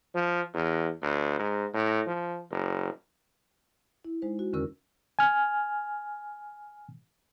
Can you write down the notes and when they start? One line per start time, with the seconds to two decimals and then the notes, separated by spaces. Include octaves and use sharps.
0.14 F3
0.54 E2
1.02 D2
1.39 G#2
1.73 A2
2.07 F3
2.50 F#1
4.05 E4
4.22 G#3 D#4 C5
4.39 F#4
4.53 E2 D3 D#3 C#4 A#4 E6
5.19 G#5 F6